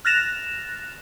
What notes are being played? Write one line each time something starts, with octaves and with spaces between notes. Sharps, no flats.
F6 F#6 A6 A#6 E7 F7